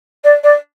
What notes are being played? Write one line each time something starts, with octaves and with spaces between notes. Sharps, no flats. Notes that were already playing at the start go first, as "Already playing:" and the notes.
D5
D5